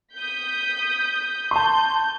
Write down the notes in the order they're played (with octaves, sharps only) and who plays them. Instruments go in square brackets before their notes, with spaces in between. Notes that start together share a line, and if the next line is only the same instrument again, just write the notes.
[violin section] D#6 G6 B6
[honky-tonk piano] A5 C6 [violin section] G6